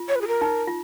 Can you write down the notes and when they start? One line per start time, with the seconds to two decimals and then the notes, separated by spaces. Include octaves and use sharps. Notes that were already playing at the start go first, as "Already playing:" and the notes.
Already playing: F4
0.08 C#5
0.15 B4
0.21 G#4
0.28 A#4
0.41 D#4
0.67 F4